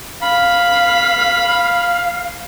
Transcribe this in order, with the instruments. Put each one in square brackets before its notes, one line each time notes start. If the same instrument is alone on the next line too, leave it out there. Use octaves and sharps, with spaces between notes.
[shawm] F5 [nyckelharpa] B5